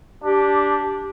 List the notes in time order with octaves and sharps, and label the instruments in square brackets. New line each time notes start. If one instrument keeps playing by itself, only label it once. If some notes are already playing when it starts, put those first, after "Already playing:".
[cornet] D4 [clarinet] G4